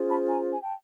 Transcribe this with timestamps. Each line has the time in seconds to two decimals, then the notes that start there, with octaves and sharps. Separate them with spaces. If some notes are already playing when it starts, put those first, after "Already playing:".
Already playing: C#4 F4 G#4 C5
0.08 A5 B5
0.26 G#5 A#5
0.54 G#5
0.62 G5 A5